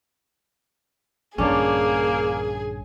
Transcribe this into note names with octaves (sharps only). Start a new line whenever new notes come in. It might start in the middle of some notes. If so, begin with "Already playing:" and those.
A#1 G2 D3 A#3 C#4 D4 G#4